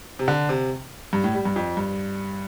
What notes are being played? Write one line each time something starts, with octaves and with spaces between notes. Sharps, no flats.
C3
D3
C3
G2
A2
G3
G2
F2
G2